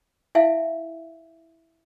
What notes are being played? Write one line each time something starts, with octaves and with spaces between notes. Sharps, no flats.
E4 E5 F5 G#5